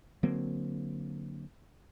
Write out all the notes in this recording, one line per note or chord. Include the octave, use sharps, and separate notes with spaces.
D3 F#3 A#3 C4